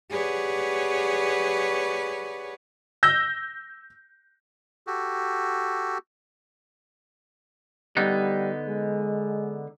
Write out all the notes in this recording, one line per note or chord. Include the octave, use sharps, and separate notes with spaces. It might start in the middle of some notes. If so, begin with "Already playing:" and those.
G4 G#4 B4 C#5 D5 F#5
E6 G6 A#6
F#4 G4 A4
D3 G3 B3 D#4
G#3